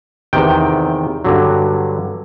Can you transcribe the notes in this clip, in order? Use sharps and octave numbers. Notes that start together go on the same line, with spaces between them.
E2 C3 D#3 G5
G2 D3 F#3